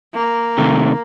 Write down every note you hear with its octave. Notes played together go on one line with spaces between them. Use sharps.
A#3
C3 D#3 A3